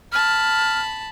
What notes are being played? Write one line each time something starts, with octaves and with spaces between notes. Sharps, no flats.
A5 B5 F6